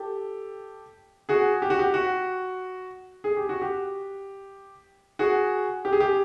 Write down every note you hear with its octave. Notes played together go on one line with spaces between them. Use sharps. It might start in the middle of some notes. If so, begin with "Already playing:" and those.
Already playing: G4 A4
F#4 G#4
G4
F#4
G4
F#4
G#4
G4
F#4
G4
F#4 G#4
G4
G#4
G4